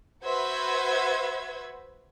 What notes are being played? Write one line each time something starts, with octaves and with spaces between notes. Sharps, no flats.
F#4 B4 C5 E5 G#6